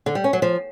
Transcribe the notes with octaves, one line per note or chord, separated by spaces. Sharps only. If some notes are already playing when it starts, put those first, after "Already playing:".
D3
G3
C#4
F#3
F3